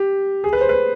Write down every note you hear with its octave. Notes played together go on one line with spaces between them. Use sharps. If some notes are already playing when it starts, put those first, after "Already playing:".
Already playing: G4
G#4
B4
C5
B4